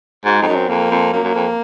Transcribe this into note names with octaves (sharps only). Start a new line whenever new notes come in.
G#2 F#4
F2 D#4
F#2
C4
F2 A#3
F2
F#2 A#3
F#2
F2